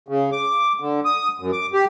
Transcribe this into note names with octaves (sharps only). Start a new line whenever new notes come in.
C#3
D6
D3
D#6
F#2
D6
G4